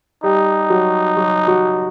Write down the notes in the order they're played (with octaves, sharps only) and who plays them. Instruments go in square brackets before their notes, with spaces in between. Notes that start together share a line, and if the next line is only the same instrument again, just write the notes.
[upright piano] G3 G4 [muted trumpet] D#4
[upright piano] F#3 F#4
F#3 F#4
F#3 F#4